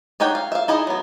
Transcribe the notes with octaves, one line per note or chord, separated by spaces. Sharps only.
D4 D#4 C#5 F#5 G5
F5
E5 F5
D#4 E4 G#4 D#5
F#3 B3